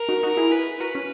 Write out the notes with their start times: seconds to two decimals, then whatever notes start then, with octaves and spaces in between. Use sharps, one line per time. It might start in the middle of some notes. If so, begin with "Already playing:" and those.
Already playing: A#4
0.09 D#4 F#4
0.23 D#4 F#4
0.37 E4 G#4
0.52 B4
0.80 F#4 A#4 B4
0.95 C#4